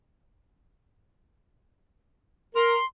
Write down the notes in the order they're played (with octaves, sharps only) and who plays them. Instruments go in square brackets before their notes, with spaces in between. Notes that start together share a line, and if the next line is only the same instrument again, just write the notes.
[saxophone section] A#4 [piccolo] C6